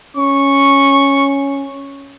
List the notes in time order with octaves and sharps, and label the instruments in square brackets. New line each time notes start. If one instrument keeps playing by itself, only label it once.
[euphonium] C#4 [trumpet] C#6